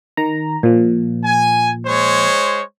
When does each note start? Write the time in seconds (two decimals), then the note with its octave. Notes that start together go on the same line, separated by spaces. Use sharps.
0.17 D#3 A#5
0.63 A#2 F3
1.24 G#5
1.86 G#3 C5 C#5